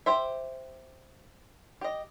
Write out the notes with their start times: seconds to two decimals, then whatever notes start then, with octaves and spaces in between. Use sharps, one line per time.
0.06 G4 C5 E5
1.81 G4 D#5